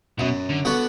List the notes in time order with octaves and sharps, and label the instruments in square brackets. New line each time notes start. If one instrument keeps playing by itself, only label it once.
[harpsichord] F#2 [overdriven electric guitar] B2
[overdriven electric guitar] D3
[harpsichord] D3 B3 F#4